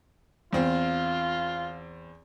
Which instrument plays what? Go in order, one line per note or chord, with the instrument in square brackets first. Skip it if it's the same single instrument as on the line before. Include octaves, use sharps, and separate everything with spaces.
[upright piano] E2 C4 [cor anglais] F4